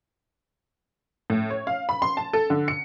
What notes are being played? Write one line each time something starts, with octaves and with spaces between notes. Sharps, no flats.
A2
C#5
F5
B5
C6
A5
A4
D3
C#7